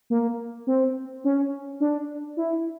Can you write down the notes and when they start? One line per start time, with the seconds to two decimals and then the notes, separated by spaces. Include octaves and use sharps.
0.10 A#3
0.67 C4
1.24 C#4
1.80 D4
2.37 E4